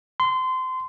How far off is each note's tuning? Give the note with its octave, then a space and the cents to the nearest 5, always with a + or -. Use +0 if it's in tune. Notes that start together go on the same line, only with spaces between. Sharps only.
C6 -25